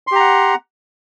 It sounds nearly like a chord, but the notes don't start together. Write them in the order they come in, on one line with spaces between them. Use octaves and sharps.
C6 G4 A#5 F#5